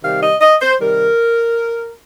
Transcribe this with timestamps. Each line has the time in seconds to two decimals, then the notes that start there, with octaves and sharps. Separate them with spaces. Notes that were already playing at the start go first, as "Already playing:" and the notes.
0.02 C3 D#3 G3 F5
0.22 D#5
0.41 D#5
0.61 C5
0.80 C3 D#3 G3 A#4